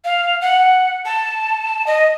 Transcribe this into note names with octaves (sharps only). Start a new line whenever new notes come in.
F5
F#5
A5
D#5